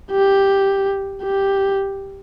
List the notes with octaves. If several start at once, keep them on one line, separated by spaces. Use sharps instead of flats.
G4
G4